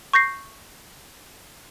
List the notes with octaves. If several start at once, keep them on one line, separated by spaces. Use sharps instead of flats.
C#6 G6 A#6 C7